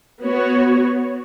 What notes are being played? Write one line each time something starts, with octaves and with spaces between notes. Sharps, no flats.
B3 F#4 C#5